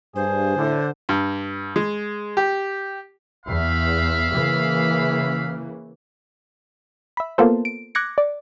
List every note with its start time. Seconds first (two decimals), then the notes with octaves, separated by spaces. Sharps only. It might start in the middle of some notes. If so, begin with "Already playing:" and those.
0.16 G2 G#4 C5
0.57 A2 D3
1.09 G2
1.76 G#3
2.37 G4
3.46 E2 E5 F5 B5
4.30 C#3 E3 A#3
7.17 E5 B5
7.38 A#3 B3 F4 A4 C5
7.65 D7
7.95 D6 F#6 G#6 A#6 C#7
8.18 D5